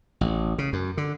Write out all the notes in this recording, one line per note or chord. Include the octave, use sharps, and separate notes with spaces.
A1
C#3
F#2
D3